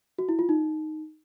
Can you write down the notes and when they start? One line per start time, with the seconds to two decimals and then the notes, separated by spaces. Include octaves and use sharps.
0.18 F#4
0.29 E4
0.39 F4
0.49 D#4